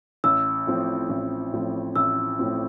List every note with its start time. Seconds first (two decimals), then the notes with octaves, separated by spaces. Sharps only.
0.24 A1 E6
0.67 A2 F3 C4
1.09 A1
1.53 A2 F3 C4
1.96 A1 E6
2.39 A2 F3 C4